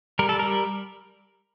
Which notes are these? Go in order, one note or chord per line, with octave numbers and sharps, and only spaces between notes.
G3 A#4
A4
G3 A#4